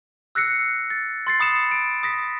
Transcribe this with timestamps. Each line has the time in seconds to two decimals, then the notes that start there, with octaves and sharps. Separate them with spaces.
0.35 E6 F#6 A#6 C7 C#7
0.90 A6
1.27 C6 A6 C7
1.40 B5 D#6 C#7 E7
1.72 D7
2.03 D#6 A#6 B6